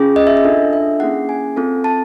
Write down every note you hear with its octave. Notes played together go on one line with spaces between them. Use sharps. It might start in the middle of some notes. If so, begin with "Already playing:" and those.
Already playing: C#4 F4 G#4
D#5
E5
D#5
D4 F4 A4
E5
A#3 C#4 E4 G#4 F#5
G#5
C4 F4 A4
A5